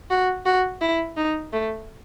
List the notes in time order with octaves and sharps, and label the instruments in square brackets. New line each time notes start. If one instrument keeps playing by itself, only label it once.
[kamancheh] F#4
F#4
E4
D#4
A3